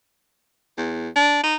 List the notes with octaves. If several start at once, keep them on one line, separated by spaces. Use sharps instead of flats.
E2
D4
D#4